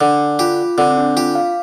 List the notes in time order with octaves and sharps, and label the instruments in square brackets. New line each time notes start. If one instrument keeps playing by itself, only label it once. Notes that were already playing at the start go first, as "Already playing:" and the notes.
[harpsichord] D3 [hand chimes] D4
[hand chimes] F4 [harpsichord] G4
[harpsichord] D3 [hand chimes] C4
[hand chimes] C4
D4
[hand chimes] F4 [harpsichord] G4
[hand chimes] F5